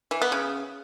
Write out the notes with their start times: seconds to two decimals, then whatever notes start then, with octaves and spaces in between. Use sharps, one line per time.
0.11 E3
0.22 B3
0.32 C#3